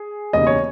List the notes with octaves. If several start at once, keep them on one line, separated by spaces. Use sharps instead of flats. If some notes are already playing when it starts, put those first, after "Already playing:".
Already playing: G#4
E1 D#2 C#3 D#5
C#5